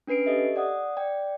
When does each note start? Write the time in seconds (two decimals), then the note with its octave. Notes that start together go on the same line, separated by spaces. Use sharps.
0.07 C#4 D4 B4 C7 D7
0.26 G4 A4 D#5 E5
0.56 D5 F#5 D#6
0.97 D5 G5